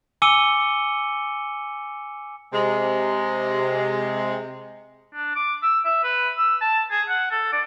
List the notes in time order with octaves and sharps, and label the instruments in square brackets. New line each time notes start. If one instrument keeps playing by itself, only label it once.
[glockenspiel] G#5 D6 E6 C#7 D#7 G7
[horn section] C3 G#3
[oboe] D4
D6
E6
E5
B4
E6
A5
G#4
F#5
A4
D5